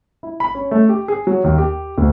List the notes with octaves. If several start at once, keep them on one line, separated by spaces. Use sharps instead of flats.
E4
B5
C#4
A3
G4
G#4
F#3
D#2
G4
D2